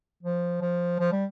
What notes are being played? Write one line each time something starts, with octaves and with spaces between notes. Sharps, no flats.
F3
F3
F3
G3